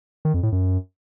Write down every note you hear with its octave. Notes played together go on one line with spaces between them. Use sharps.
D#3
F2
A2
F#2